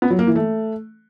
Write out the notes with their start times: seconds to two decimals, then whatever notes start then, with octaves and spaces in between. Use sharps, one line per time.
0.02 B3
0.10 F#3
0.19 A#3
0.27 E3
0.35 A3